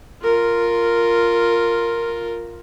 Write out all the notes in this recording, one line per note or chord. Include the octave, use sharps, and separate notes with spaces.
F4 A#4